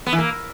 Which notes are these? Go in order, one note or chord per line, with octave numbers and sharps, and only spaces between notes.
B3
E3
A#3